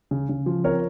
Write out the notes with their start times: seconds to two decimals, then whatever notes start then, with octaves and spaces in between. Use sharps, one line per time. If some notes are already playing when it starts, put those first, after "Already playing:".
0.11 C#3
0.29 C#3
0.46 F3
0.64 C4 A#4 C#5